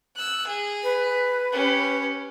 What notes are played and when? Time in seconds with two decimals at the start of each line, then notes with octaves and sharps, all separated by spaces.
0.15 E6 F#6
0.47 G#4
0.83 B4
1.52 C#4 G4